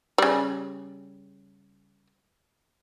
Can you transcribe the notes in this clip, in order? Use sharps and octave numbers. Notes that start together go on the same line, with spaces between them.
C#3 G3